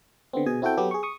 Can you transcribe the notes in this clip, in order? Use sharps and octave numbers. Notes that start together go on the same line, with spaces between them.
D3 B3 C4
B2 G#4 G#5
C4 E4 F#4 A4 G5
F#3 B3 G4 A4
G#4 C#6
C#6 D#6